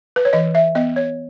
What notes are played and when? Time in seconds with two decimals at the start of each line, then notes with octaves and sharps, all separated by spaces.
0.16 B4
0.25 C#5
0.33 E3 D#5
0.55 E5
0.75 B3 D#5
0.96 C#5